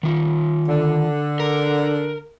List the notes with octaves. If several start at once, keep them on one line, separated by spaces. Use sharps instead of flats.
D#3 F4
D3
A#4